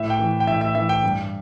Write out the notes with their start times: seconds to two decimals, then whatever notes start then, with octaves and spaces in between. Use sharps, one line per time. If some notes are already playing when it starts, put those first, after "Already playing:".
Already playing: A2 E5
0.10 G5
0.19 E3
0.40 G5
0.47 A2 E5
0.61 E5
0.75 E3 E5
0.89 G5
1.04 G2